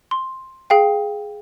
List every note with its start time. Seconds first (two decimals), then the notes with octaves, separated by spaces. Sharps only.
0.11 C6
0.70 G#4 F5 G5